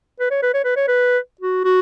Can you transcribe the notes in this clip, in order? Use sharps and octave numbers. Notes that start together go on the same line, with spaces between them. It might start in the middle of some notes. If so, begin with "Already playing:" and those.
B4
C#5
B4
C#5
B4
C#5
B4
F#4
F#4